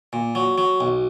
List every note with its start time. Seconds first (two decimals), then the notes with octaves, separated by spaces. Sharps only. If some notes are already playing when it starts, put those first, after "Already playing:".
0.13 A#2
0.35 F#3
0.58 F#3
0.81 B1